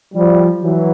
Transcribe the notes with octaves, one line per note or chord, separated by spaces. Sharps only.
F3 G3
E3 F#3